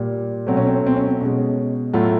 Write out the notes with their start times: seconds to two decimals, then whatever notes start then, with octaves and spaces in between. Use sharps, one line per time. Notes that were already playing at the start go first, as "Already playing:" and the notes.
Already playing: A#2 G3
0.47 B2 F#3 A3 C4
0.57 C#4
0.67 C4
0.76 C#4
0.86 C4
0.96 C#4
1.06 C4
1.20 B2 G#3 C#4
1.93 A2 F#3 A3 F4